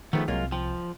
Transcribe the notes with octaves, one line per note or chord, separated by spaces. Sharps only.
D#3 F3 A3 B3 G#4
C2 C3 F#3 G#3 A#3 F4
F3 G5